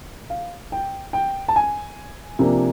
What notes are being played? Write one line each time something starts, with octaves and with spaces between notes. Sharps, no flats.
F5
G5
G5
A5
G#5
C3 F3 A#3 D4